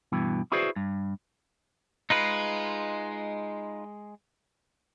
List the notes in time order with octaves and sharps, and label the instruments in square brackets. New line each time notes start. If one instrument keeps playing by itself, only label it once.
[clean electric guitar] G2 B2 E3
E4 F#4 G#4 B4 C5 D5
G2
[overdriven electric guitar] G#3 [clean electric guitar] D#4 F4 B4